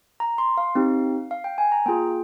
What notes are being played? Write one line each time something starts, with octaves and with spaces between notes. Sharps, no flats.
A#5
C6
F5
C4 D#4 G4
F5
G5
G#5
A#5
A#3 F4 G#4 G5